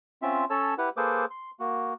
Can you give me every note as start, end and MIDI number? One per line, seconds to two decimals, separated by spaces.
0.22 0.45 60
0.22 0.45 61
0.22 0.45 65
0.22 0.45 76
0.50 0.74 61
0.50 0.74 69
0.50 0.74 73
0.50 0.74 81
0.50 0.74 88
0.78 0.89 64
0.78 0.89 67
0.78 0.89 71
0.78 0.89 78
0.97 1.25 58
0.97 1.25 68
0.97 1.25 69
0.97 1.25 71
0.97 1.25 72
0.97 1.25 86
1.30 1.51 84
1.60 1.94 58
1.60 1.94 66